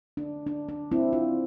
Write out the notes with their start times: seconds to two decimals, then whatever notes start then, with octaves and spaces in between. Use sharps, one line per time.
0.17 D4
0.47 D4
0.69 D4
0.92 C4 E4
1.13 D4 F4